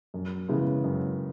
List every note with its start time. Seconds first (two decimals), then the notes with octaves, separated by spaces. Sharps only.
0.14 F#2
0.48 C#3 E3 G#3 B3
0.84 F#2